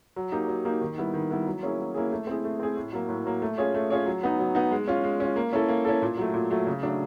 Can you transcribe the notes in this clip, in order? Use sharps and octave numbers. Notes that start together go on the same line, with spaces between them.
F#3
A#3 D#4 G4
F#3
A#3 D#4 G4
D#3
G3 B3 E4
D#3
G3 B3 E4
F#3
A#3 C#4 E4 G#4
F#3
A#3 C#4 E4 G#4
A3
C4 E4 G#4
A3
C4 E4 G#4
A2
F#3 A#3
A2
F#3 A#3
A3
C#4 F4 G#4 C#5
A3
C#4 F4 G#4 C#5
F#3
B3 D#4
F#3
B3 D#4
G#3
C#4 F4
G#3
C#4 F4
A#3
C#4 E4 A4
A#3
C#4 E4 A4
A#2
F#3 A3
A#2
F#3 A3
C#3
F#3 A3 D4